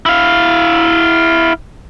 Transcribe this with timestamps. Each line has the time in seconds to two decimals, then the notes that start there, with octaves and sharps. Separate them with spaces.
0.06 E4 F5